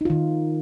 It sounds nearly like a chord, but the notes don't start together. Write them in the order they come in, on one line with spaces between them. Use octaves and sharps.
D#4 F4 D#3